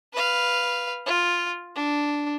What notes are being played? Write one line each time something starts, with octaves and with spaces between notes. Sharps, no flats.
B4 F5
F4
D4